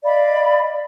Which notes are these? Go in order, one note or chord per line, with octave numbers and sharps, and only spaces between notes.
D5 D#5 F5 B5